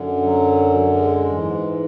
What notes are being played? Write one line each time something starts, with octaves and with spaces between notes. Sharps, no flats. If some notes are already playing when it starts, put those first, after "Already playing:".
Already playing: F#2 D3
F#3
G#3
G#2 E3